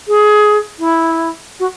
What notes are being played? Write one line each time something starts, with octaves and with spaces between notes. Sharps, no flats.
G#4
E4
F#4